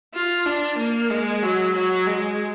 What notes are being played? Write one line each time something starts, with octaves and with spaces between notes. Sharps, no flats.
F4
D4
A#3
G#3
F#3
F#3
G#3